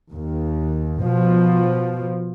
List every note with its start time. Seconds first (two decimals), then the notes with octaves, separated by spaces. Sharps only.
0.12 D#2
1.01 B2 F3